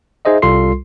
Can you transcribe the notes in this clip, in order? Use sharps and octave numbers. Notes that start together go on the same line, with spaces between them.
D#4 G#4 C5 D#5 E5
C2 G3 F4 A4 C6 C7